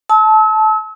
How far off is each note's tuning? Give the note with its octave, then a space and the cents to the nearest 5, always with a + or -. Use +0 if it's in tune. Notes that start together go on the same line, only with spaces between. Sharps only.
A5 -20 E6 -40